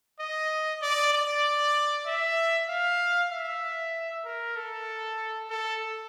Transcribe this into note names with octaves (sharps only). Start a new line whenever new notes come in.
D#5
D5
D5
E5
F5
E5
A#4
A4
A4